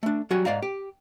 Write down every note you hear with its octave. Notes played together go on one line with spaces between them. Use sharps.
A3 D4
F#3 G3 F#4 G#5
G#2 D5 F5 A#5
G4